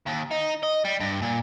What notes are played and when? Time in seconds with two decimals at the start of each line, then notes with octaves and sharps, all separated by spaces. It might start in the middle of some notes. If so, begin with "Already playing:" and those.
0.06 D#2
0.31 D#4
0.63 D#5
0.85 G3
1.00 G2
1.22 A#2